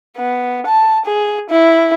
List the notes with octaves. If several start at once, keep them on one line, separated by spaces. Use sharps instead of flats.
B3
A5
G#4
E4